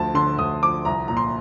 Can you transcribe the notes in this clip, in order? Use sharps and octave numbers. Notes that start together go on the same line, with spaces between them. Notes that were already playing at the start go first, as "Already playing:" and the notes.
Already playing: D2 F3 A5
D3 C6
D2 D#6
F3 D6
C2 A#5
A#2 A#5
C6